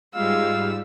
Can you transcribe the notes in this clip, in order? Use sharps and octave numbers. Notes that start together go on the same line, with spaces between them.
G#2 G3 G#3 F4 F5 E6